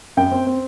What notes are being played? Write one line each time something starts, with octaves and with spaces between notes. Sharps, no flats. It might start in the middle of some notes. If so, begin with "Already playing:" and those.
F#2 G5
C4
C4